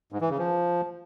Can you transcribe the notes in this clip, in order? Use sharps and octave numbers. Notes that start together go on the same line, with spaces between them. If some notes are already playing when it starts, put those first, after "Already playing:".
G#2
E3
C#3
F3